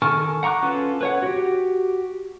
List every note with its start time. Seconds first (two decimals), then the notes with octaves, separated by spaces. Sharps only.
0.02 D#3 A4 G#5 C#6 F6
0.43 F#5 A#5 C#6 D6 F#6
0.62 C#4 F4 A4 B4
1.01 B4 C#5 F#5
1.23 F#4 G4